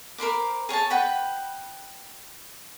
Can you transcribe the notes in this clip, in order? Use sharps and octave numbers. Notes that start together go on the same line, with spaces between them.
A#4 C5 B5 D6
G#4 C#5 G#5 A5
B4 F#5 G5 B5